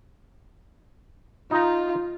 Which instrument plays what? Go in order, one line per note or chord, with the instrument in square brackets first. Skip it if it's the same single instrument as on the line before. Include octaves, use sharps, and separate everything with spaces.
[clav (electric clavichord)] D#4 A#5 [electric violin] F4